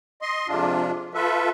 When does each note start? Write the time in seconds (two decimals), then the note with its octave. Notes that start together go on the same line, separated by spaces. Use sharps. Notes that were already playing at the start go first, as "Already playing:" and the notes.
0.22 D#5 C6
0.48 F2 C3 G#3 D4 F4
1.14 F4 A4 B4 E5